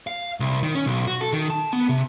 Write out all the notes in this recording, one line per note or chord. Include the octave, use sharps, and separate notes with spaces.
F5
C2
D#3
C#4
B1
F#4
A4
D#3
A5
B3
C3